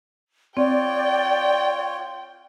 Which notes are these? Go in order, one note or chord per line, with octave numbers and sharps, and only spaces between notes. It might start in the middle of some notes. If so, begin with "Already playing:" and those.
C4 F4 C#5 D5 G5